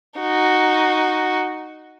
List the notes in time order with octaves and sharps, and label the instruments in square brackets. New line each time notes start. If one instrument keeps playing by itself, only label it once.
[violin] D#4 F#4